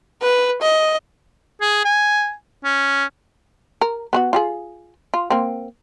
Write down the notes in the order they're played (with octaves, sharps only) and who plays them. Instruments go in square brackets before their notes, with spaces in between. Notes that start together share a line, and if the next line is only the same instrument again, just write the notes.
[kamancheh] B4
D#5
[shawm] G#4
G#5
C#4
[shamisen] A#4
B3 C4 F#4
F4 G4 G#4
F4
A#3 C4